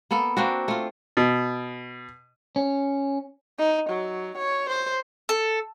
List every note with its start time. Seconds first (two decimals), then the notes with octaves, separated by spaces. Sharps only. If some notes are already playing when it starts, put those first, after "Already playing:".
0.11 A#3 B3 A4
0.37 A#3 C4 D4 F#4
0.68 A3 F4
1.17 B2
2.56 C#4
3.59 D#4
3.90 F#3
4.38 C#5
4.70 C5
5.29 A4